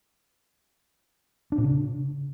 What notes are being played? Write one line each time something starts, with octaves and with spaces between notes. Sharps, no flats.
D4
A#2
C#3